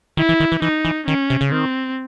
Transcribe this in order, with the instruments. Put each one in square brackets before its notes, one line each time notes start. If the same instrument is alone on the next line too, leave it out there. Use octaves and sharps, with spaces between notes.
[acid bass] D#3 [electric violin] E4
[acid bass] E3
D#3
E3
[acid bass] E3 [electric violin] D#4
[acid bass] E3
[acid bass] D#3 [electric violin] C#4
[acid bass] C3
C#3
[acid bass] D#3 [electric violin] C4